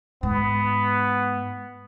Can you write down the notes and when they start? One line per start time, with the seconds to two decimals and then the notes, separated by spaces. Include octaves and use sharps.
0.23 G#2 B3